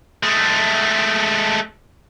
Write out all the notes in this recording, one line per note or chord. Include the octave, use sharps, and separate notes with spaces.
G#3 A3